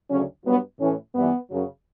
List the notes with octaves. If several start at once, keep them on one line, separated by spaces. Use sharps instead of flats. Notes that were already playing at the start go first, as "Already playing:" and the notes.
D2 C#3 F#3 C#4
G2 F#3 B3
A2 E3 C#4
G2 E3 B3
F#2 C#3 F#3